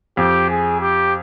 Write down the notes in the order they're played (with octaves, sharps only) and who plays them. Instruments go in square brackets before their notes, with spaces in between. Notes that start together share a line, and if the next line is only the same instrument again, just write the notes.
[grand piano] F2 [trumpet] G4
[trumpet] G#4
G4